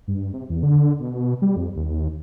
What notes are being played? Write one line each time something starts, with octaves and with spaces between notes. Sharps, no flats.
G2
C3
E2
D3
B2
G3
F2
D#2